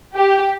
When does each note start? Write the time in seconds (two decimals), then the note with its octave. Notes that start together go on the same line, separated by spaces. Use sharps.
0.15 G4